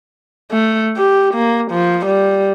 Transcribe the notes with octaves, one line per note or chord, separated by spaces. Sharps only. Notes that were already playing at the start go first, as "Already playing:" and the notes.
A3
G4
A#3
F3
G3